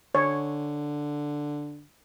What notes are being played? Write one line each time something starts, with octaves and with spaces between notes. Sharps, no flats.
D3 C#5